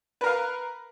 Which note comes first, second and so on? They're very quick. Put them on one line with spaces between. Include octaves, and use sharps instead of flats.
B4 A#4 F5